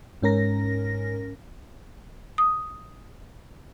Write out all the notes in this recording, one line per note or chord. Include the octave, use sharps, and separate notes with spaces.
G#2 C#4 A#4 A#6
D#6